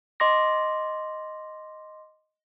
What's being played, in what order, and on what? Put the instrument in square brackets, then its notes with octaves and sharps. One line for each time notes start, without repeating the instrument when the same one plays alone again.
[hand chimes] D#5 C6 D6 A#6